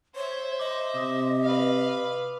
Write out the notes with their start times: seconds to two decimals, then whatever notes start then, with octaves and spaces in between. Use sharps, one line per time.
0.15 C5 C#5 E5
0.60 D#5 C6 D6
0.95 C3 D6 D#6
1.43 B4 F5